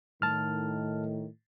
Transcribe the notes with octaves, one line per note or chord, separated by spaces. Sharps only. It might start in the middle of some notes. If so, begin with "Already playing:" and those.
A2 D#3 A5 F6